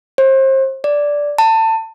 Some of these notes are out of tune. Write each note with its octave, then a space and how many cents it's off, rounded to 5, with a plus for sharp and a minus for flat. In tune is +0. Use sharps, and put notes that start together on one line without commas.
C5 +35
D5 -5
A5 +25